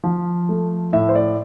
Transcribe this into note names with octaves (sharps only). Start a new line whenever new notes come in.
F3
A3
A2 E5
C5
D5